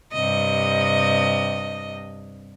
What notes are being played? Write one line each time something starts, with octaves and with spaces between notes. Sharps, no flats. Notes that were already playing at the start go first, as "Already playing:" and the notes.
G2 C3 D#5